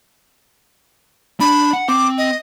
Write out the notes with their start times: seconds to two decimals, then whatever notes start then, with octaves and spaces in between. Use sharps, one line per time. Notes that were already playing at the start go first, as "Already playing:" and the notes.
1.40 D4 B5
1.73 F#5
1.88 C4 D6
2.18 D#5